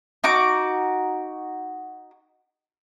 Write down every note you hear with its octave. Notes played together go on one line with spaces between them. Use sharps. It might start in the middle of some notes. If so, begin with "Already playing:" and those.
D#4 F#4 D6